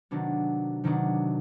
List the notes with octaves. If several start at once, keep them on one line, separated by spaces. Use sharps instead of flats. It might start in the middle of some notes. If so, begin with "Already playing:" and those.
C3 D#3 F#3 B3 D4
C3 D#3 F#3 B3 D4